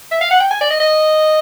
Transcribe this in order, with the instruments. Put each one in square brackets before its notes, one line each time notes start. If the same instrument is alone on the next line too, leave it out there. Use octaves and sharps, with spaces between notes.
[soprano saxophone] E5
F5
F#5
G5
G#5
D5
D#5
D#5